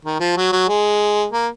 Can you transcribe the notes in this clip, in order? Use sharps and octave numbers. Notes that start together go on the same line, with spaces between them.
D#3
F3
F#3
F#3
G#3
A#3